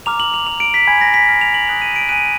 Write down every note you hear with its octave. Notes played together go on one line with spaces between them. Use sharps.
A#5 D6 F6 F7
F#7
F7
A#5 D6 F6 F7
D7
B6
G#5 B5 F6 G#6
A#6
B6
G#5 B5 F6
F7
F#7
G#5 D#6 F#6 F7
D#7
D7
G#5 D#6 F#6 D#7